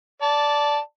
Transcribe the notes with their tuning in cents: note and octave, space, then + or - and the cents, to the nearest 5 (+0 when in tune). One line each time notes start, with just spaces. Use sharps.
D5 -10 A5 +0